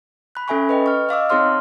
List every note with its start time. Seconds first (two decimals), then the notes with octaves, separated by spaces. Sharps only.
0.35 B5 F#6
0.48 C#4 A4 E5 G#5 B5 C#6
0.69 B4 D#5 G5
0.86 C#6 F6
1.09 D#5 F5 D6 E6
1.29 C4 D#4 G#4 C#5 C6 F6